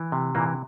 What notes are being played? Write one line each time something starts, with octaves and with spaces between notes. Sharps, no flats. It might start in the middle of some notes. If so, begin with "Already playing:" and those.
Already playing: E3
C3
A#2 E3 A#3